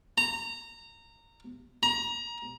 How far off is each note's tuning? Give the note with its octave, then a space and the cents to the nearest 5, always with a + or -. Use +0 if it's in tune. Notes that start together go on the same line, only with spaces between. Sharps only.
A#5 -20
A#5 +25